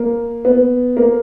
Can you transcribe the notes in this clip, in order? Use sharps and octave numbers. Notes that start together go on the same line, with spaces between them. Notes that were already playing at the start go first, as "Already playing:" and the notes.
Already playing: A#3
B3
A#3